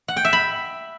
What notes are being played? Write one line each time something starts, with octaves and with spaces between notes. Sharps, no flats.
F#5
G5
E5
B5